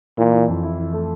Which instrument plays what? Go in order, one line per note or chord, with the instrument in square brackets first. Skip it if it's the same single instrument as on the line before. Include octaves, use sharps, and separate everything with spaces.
[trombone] A#2 [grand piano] E3
[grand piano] E3
F2
E4
E3
A3